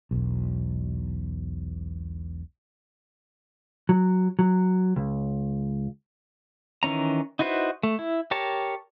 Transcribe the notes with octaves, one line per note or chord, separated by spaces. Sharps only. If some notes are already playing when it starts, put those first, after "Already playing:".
E1 B1
F#3
F#3
C#2
D#3 E3 C#4 A#5
D#4 E4 F#4 B4 C5
A3
E4
G4 A#4 C#5 A5